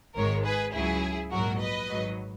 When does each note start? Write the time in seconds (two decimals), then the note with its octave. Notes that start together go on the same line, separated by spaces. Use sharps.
0.16 G#1 G#2 D#3 G#3 A#4 C#5
0.45 G#4 B4
0.74 C#2 C#3 F#3 E4 G#4
1.31 A#1 G#2 F#3 F#4 A#4
1.60 B4 D#5
1.89 G#1 G#2 F#3